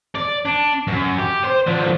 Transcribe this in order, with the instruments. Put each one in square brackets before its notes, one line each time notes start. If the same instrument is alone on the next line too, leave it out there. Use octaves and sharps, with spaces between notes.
[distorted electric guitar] D5
D4
F#2
G4
C5
D3 F3